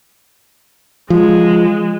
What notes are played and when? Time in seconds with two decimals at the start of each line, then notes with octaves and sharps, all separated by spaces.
1.10 F3 G#3